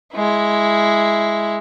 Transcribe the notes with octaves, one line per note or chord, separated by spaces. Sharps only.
G#3 E4